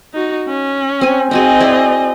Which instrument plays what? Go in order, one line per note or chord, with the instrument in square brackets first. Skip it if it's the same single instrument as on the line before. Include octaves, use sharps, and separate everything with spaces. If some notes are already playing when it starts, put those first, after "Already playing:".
[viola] D#4 F#4
C#4
[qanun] C4 G#5
[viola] C4 D#5 [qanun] D#4 F#4 G#4
[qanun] E4 G#4 D5